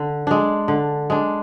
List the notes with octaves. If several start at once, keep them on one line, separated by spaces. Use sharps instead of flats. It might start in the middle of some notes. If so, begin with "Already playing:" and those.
Already playing: D3
G#3 D4
D3
G#3 D4